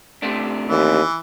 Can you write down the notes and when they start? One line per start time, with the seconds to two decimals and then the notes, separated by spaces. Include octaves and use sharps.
0.22 C3 A3 D4
0.68 D#2 E3